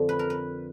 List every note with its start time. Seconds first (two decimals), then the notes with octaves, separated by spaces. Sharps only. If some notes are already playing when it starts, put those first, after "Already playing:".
Already playing: F2 D3 F3
0.09 B4
0.19 A#4
0.30 B4